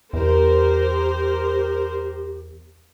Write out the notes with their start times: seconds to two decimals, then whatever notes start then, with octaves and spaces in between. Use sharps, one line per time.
0.13 E2 G4 A#4 C5